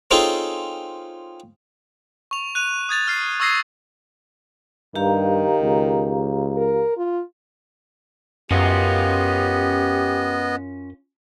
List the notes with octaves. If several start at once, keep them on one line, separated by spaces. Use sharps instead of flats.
C4 C#4 D#4 F4 G#4 A4
C#6 F7
F#6 D#7 F7
D#6 G#6 A6 F7
F6 C7
C#6 D#6 E6 G#6 A#6 C7
G2 D#3 G4 F5 A#5
C#2
A#4
F4
F#2 B3 C#4 F4 G4 D#5